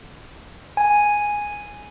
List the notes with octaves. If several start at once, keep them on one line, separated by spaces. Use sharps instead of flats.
G#5